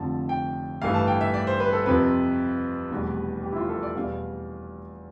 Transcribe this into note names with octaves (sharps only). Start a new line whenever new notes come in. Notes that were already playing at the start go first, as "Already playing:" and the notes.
Already playing: F1 F2 D3 F3 A5
G5
A1 G2 E3 A3 F5
A5
G5
E5
D5
C5
B4
A4
F2 C3 F3 C4 B4
F1 E2 B2 G3
G4
E4
F4
A4
D5
E2 B2 G3 F5